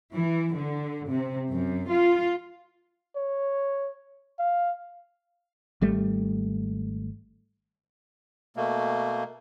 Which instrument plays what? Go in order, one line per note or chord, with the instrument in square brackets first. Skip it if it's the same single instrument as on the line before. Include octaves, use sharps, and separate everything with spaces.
[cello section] E3
D3
C3
F#2
F4
[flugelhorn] C#5
F5
[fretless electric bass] G#1 G3 A3
[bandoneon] B2 A3 A#3